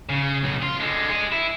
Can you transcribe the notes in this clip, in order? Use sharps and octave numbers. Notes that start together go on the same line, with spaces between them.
C#3
B1
F4
D3 G#3
G#4 D#5
E4